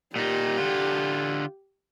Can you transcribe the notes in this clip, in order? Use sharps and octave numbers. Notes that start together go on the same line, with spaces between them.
A#2 D#4 G4
D3 F4